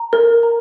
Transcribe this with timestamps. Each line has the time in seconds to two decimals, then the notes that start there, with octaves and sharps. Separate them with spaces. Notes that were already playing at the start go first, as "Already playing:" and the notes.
Already playing: A#5
0.13 A#4
0.43 A#5